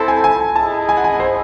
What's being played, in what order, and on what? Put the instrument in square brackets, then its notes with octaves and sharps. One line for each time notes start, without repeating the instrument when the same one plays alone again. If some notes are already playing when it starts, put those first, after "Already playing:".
Already playing: [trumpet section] C4 E4 A4 C5 [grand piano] A5
[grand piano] G#5
G#5
[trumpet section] E4 G#4 D#5 [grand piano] A5
[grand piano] G#5
F#5
G#5
C5